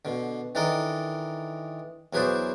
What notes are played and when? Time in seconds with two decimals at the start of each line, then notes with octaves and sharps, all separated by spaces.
0.05 B2 D3
0.55 D#3 E3 D4 A4 A#4 D#5
2.13 E2 F#3 G#4 B4 C5 D5